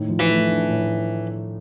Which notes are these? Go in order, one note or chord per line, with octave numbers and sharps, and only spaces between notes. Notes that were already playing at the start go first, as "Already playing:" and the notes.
Already playing: A2 D#3
F3
E3
A3
D4
A2